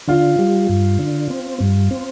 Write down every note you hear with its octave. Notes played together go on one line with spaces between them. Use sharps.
D3 F4
G3
G2
D3
C4
G2
C4